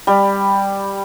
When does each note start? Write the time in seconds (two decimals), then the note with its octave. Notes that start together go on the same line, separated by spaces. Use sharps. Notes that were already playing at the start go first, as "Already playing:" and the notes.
0.07 G3